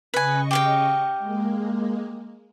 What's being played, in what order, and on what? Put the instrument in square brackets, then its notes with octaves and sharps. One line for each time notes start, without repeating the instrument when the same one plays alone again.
[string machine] C#3 D#5 C#6 [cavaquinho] B4 G#5
[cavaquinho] G4 F5 G5
[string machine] G#3 A#3